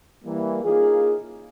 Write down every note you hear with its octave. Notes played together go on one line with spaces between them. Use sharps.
E3 G3 A#3
A#3 C#4 D#4 F4 G#4